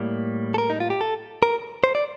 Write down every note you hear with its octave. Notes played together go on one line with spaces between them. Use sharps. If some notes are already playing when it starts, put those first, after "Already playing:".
Already playing: A2 G3 A#3
A4
A#4
D#4
F4
G4
A4
A#4
C5
D5